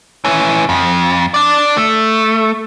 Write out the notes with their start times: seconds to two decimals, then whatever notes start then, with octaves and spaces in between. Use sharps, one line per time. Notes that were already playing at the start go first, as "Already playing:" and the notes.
0.25 E3 C#4
0.69 F2
1.34 D4 D5
1.77 A3